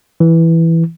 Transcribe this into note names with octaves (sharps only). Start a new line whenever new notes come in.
E3